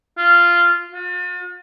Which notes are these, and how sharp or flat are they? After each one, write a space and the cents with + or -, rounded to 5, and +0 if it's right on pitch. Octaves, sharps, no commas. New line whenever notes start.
F4 -10
F4 +45